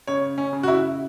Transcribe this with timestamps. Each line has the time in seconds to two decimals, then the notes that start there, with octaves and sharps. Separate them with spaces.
0.07 C#3 C#5
0.38 C#4
0.53 C#3
0.63 F#4
0.68 E4